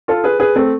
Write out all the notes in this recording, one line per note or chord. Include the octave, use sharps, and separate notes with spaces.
F4 A4
G#4 B4
G#4 B4
A3 C4